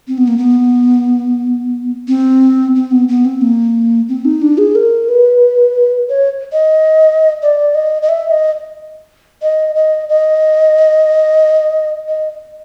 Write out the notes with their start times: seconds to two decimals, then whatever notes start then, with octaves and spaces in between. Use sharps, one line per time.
0.08 C4
0.18 B3
0.28 A#3
0.38 B3
2.08 C4
2.75 C4
2.91 B3
3.08 B3
3.25 C4
3.42 A#3
4.09 C4
4.25 D#4
4.42 D4
4.58 G#4
4.75 A#4
5.09 B4
6.09 C#5
6.53 D#5
7.42 D5
7.75 D#5
8.02 D#5
8.09 E5
8.31 D#5
9.42 D#5
9.76 D#5
10.09 D#5
12.09 D#5